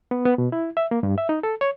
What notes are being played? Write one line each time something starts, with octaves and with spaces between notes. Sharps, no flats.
B3
B3
B2
E4
E5
A#3
G2
E5
D#4
A4
C#5